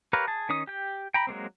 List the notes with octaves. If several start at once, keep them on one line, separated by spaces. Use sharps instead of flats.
G4 A#4 B4 C#5 F5
G#4 A5
D#3 C#4 D#4 D#6
G4 G5
G5 A#5 B5
F#3 G#3 A#3 C4